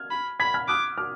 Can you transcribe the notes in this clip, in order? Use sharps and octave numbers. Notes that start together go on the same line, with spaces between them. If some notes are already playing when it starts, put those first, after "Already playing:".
Already playing: F6 G#6
B5
B5 G#6 B6
F6 G#6
D6 D#6 F#6
D6 F6